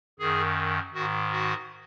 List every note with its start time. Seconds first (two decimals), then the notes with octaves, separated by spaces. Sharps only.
0.19 F#2 D#3 G#4
0.94 G#2 D#3 F#4
1.32 F#4